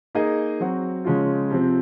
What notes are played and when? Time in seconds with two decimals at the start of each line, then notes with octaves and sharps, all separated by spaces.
0.15 A#3 D#4 G#4 D#5
0.60 F#3 C4 F#4
1.05 C#3 F3 G#3 C#4 F4
1.50 C3 F3 C4